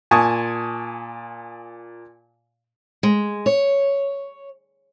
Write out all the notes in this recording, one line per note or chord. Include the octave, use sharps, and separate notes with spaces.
A#2 G#5 A5 C#6 D#6
G#3
C#5